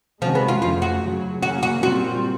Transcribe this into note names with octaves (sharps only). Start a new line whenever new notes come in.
C3 D#3 F3 G#3 C#4 F#4
B3
F4
F2 C#3 F3 A3 F4
F#4
F#2 C#3 F#3
C#3 F#3 A#3 C#4 F#4
F#4
A#2 G3 C4 F4 F#4